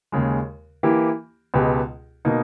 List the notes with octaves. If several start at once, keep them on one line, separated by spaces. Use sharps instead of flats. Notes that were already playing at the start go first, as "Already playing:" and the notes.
D#2 C#3 G#3
E3 A#3 E4 G4
C#2 B2 G#3 B3 G4
B2 A#3 D#4